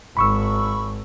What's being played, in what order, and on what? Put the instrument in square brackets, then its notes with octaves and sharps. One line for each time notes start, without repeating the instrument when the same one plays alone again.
[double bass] G#1 [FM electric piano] B5 C#6 E6